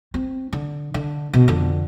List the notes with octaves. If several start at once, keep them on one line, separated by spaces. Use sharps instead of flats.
C4
D3
D3
B2
F2 D3